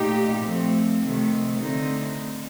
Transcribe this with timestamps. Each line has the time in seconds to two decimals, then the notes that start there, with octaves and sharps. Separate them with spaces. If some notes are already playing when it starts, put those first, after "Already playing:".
Already playing: A#2 A3 D#4 G4
0.42 F3 A3 C4
1.01 C3 D#3 A3
1.59 D3 A3 C4 D#4